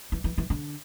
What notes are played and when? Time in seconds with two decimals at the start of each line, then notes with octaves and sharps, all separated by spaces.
0.12 E3
0.24 E3
0.38 E3
0.50 D3